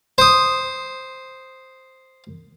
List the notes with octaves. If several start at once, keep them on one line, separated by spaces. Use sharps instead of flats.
C5 D#6